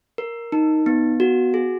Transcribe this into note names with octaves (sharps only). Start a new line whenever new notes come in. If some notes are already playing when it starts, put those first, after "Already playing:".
A#4
D#4
B3
F#4
G#4